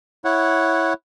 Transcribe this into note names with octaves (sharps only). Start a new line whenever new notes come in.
E4 C#5 F#5